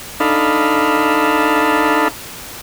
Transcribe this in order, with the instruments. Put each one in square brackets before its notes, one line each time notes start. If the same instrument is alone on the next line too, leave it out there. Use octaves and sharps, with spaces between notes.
[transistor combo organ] D4 D#4 A4 F5 B5